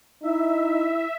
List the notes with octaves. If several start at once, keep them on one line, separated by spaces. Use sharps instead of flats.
D#4 E4 E5